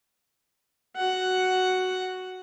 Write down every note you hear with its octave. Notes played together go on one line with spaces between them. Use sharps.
F#4 F#5